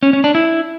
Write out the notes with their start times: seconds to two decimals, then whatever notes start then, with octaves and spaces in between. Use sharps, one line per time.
0.03 C#4
0.13 C#4
0.24 D4
0.35 E4